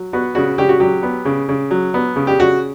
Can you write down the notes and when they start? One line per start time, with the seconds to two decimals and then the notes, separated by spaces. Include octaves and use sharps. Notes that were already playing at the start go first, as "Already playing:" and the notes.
Already playing: F#3
0.13 B3 F#4
0.35 C#3 F#4
0.58 C#3 G4
0.69 F#4
0.80 F#3 G4
1.03 B3
1.25 C#3
1.49 C#3
1.71 F#3
1.94 B3
2.16 C#3
2.27 G4
2.39 C#3 F#4